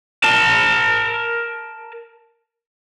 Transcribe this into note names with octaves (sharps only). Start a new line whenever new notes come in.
A#4 A5